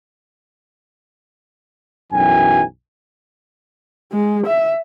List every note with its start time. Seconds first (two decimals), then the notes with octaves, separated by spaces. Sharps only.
2.13 B1 F#2 E3 G5 G#5
4.12 G#3
4.47 E5